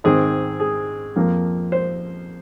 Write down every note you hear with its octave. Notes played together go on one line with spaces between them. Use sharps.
G#2 D#3 C4 G#4
G#4
F2 F3 A#3
C5